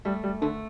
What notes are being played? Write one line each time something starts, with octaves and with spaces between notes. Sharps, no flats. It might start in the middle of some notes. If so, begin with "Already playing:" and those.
G3 A3
G3
D3 A3